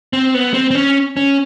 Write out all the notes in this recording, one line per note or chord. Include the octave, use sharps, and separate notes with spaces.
C4
B3
C4
C4
C#4
C#4